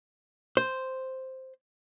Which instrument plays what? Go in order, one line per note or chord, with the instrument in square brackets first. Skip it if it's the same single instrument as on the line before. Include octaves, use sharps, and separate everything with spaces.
[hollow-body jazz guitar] C5